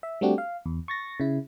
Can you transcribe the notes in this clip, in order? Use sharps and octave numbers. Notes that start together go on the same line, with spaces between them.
E5
G3 A3 C4 D4 F#4 G4
F5
E2
C#6 A6 A#6
C#3 E4